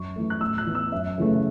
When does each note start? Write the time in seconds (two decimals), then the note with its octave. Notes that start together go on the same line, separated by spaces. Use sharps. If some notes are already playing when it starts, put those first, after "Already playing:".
Already playing: F#2 C#6
0.16 E3 A3
0.30 F#6
0.41 A2 E6
0.58 F#6
0.66 E3 B3
0.75 E6
0.92 F#2 E5
1.18 C#3 E3 A3